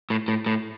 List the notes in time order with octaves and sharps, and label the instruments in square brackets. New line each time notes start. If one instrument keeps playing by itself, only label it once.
[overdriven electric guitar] A2
A2
A2